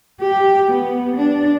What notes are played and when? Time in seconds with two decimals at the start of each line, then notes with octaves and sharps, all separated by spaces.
0.21 G4
0.71 B3
1.16 D4